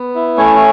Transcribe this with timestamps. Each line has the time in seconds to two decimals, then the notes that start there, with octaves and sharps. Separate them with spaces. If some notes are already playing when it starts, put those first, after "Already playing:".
Already playing: B3
0.15 E4
0.37 A3 C#4 C#5